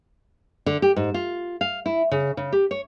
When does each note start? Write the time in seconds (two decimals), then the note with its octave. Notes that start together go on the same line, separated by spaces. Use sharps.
0.66 D3
0.82 G4
0.96 G#2
1.14 F4
1.61 F5
1.86 E4
2.11 C#3
2.37 C#3
2.52 G4
2.71 C#5